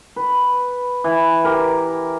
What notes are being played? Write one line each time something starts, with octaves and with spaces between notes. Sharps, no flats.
B4
E3
G4 A#4